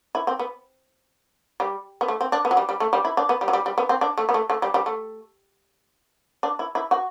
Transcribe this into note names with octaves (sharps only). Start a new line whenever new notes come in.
E4
C4
B3
G3
B3
A3
C4
D4
B3
F#3
G3
G3
A3
G3
E4
D4
B3
G3
F#3
G3
G3
B3
C4
D4
A3
B3
A3
A3
G3
G3
A3
D4
E4
E4
F#4